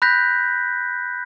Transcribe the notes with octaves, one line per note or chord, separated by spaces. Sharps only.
B5 F#6 G6 A#6 B6